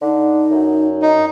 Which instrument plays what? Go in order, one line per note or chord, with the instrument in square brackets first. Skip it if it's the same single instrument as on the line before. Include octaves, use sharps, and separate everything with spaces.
[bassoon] D3 [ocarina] D#4
[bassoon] F#2
[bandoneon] D#4